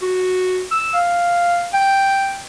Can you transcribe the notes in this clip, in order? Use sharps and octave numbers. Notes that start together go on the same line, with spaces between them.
F#4
E6
F5
G5